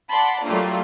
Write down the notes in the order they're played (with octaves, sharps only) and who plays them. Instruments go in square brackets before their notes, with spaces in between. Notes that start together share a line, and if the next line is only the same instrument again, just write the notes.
[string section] D5 F#5 A5 B5 C6
F#3 G3 A3 A#3 D4 F4